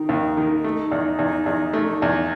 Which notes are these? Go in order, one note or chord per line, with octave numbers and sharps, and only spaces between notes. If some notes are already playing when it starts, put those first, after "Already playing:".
Already playing: D#3 D#4
D#2
D#3
A3
E2
E2
E2
A3
E2